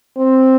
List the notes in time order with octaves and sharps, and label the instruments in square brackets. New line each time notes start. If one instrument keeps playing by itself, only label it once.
[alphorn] C4